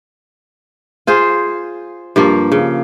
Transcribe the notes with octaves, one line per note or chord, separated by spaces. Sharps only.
F4 G#4 C5
G2 F3 A#3
C#3